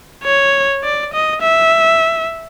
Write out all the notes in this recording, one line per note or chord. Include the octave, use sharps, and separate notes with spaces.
C#5
D5
D#5
E5